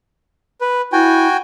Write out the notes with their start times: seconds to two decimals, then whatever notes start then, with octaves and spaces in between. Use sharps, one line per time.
0.61 B4
0.93 E4 F#4 G5 G#5